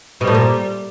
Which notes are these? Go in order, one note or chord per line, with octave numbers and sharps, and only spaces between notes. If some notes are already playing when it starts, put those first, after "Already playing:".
B2 G3
A2
A#2